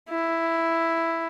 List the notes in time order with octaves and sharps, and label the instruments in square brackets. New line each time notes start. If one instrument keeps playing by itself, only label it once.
[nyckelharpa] E4